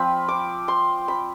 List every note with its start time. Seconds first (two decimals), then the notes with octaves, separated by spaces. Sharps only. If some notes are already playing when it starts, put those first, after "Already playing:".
Already playing: F3 C4 F4 B5
0.28 D6
0.68 C6
1.08 B5